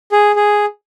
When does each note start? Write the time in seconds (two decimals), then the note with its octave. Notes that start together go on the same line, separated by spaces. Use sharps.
0.12 G#4
0.36 G#4